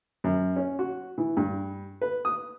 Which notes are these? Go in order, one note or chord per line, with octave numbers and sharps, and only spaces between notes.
F#2
C#4
F#4
E3
G2
B4
D#6